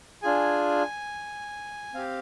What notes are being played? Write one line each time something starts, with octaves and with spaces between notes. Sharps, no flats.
D4 F4 G#4 G#5
C4 G4 F5